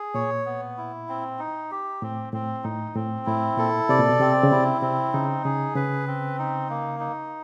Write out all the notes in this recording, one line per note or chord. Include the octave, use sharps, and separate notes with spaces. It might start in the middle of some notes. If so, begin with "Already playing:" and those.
Already playing: G#4
A#2 C#5
B3
E4
C4
D#4
G4
A2 C4
A2 C4
A2 D#4
A2 C4
A2 E4
A#2 A4
C3 D5
A#2
B2
C3 C4
C#3
C3 E4
C3 C4
C#3 D#4
C#3 G#4
C#3 B4
C4
D#4
A#3
D#4